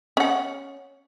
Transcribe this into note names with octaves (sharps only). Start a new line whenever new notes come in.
C#4 F#5